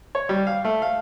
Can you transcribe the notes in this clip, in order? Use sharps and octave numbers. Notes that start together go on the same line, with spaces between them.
C#5
G3
F5
A3
F5